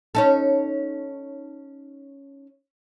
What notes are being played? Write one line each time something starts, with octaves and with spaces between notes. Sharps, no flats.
C#4 D#4 A4